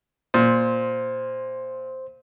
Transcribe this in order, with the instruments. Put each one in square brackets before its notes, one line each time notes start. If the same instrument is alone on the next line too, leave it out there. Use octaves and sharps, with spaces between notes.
[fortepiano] A#2 [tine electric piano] C5